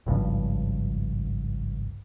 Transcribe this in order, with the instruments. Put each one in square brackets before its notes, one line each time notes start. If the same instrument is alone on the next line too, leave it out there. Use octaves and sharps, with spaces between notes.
[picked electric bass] G#1 C#2 G2 F3